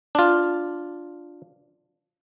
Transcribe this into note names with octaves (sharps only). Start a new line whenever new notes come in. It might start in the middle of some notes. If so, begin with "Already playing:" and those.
D4 F4